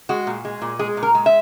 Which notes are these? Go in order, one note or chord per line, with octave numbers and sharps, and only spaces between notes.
G#3 F#4
A#2
G#3
A#2
G#3 G#4
A#2
A#4
G#3
E5